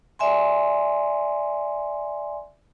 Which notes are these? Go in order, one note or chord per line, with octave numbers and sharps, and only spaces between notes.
D5 E5 G#5 C6